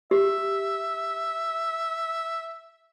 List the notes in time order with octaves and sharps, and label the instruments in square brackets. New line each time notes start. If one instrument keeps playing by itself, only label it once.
[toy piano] G4 [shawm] E5